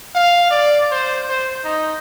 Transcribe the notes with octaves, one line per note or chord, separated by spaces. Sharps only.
F5
D5
C5
C5
D#4